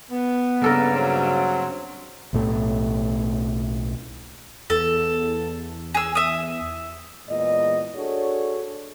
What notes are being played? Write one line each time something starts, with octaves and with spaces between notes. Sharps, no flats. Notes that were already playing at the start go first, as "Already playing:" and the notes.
B3
G2 C#3 A#3 A4 A#4
F#3 C4 F#4
B1 A2 A3
E2 A4
G#4 E6
E5 D#6
E2 A#2 G#3 D#5
D4 F#4 G#4 A4 C#5 D5